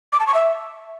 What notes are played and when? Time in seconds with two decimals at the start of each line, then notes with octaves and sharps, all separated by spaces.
0.13 D6
0.20 A5
0.27 C#6
0.34 E5